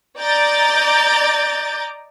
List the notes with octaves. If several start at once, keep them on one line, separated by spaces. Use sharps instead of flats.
D5 D#5 A#5 D6 G6 A6